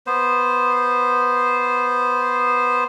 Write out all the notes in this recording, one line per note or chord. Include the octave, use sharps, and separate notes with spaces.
B3 C5